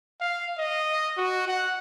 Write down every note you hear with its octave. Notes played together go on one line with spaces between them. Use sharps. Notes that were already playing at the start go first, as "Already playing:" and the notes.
F5
D#5
F#4
F#5